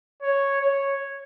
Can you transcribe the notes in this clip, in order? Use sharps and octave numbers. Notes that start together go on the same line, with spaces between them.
C#5
C#5